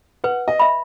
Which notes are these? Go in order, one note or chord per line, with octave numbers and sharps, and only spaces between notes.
B4 F#5
D#5
E5 B5